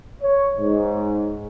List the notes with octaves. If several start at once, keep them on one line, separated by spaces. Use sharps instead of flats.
C#5
G#2